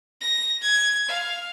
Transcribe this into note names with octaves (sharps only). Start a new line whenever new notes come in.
A#6
G#6
F5